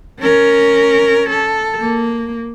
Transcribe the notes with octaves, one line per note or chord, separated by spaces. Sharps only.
C#4 A#4
A4
A#3